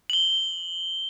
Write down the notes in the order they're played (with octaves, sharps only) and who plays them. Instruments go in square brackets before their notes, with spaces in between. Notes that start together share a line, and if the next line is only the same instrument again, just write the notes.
[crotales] F#7 G7